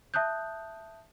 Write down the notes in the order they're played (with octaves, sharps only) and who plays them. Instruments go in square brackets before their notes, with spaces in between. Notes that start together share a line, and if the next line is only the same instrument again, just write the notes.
[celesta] E5 A5 D#6 F#6 G6